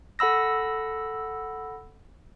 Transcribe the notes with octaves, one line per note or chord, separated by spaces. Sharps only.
A4 F#5 B5 E6 A#6